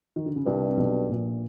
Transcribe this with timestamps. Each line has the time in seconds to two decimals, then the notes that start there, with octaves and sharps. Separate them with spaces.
0.16 D#3
0.26 D3
0.36 C#3
0.46 C2 G2 C3
0.69 C3
0.77 B1 B2
1.09 A#1 A#2